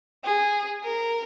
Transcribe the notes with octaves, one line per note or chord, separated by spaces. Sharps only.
G#4
A#4